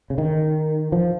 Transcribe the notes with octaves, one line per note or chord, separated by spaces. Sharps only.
C#3
D#3
F3